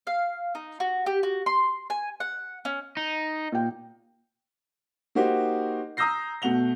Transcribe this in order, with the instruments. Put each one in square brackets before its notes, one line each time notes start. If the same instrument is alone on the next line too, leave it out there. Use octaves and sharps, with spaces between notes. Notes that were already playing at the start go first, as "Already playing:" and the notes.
[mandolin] F5
D#4
F#4
G4
F#4
C6
G#5
F#5
C#4
[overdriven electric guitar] D#4
[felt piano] A#2 G5
[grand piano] A#3 D#4 F#4 G4 C5
A#5 D#6 E6 G6 A#6 C7
B2 A3 F#5 F7 G7